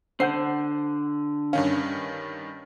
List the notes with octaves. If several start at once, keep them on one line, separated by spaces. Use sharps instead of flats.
D3 C5 F#5 G6 C7
G2 D#3 C#4 F5